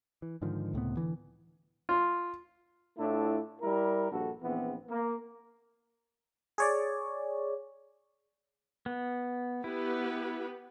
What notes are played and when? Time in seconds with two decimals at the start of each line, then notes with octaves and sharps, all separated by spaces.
0.22 E3
0.42 G#2 D3 D#3 F3
0.73 C#2 A2 C3 B3
0.97 D3 E3
1.89 F4
2.98 A2 A3 D4 E4 F4
3.61 G3 E4 A#4
4.10 A#1 G2 F#4 A4
4.43 A#1 E2 E3 B3 C4
4.89 A#3
6.58 G#4 C#5 D5
8.86 B3
9.64 B3 E4 G4 B4